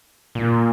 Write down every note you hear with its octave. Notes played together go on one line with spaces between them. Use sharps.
A#2